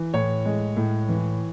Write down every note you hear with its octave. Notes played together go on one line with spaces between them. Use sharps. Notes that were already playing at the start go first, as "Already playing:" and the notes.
Already playing: E3
A2 C#5
G#3
A2
E3